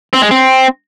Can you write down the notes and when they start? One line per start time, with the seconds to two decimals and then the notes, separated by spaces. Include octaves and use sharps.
0.13 C4
0.22 G#3
0.31 C4